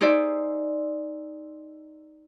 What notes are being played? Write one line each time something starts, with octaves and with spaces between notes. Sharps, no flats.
D#4 G#4 C5 D5 E5